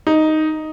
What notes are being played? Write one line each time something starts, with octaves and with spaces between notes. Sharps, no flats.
D#4